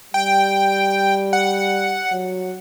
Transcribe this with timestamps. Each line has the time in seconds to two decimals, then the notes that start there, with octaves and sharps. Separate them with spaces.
0.14 G3 G5
1.33 F#5
2.12 F#3